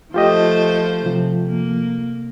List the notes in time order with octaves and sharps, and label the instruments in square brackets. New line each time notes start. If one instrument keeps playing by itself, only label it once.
[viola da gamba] F3 A3 C5 [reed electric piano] F4 G4 D#5
[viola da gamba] C3 [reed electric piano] F3
[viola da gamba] A#3